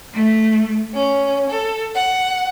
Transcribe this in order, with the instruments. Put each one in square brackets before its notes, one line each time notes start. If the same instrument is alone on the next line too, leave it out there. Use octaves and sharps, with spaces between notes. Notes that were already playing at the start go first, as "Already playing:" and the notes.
[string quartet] A3
C#4
A4
F#5